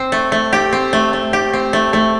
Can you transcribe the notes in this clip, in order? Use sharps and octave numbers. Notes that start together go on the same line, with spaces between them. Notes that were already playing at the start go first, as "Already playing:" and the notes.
Already playing: C4
A3
A3
G4
C4
A3
A3
G4
C4
A3
A3